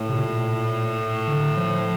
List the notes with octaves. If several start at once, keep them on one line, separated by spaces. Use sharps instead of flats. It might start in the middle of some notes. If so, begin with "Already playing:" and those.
Already playing: A2
C3
A#2
D3
F3